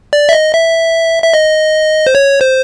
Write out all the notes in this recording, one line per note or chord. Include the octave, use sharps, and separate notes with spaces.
D5
E5
D#5
E5
E5
D#5
C5
C#5
C5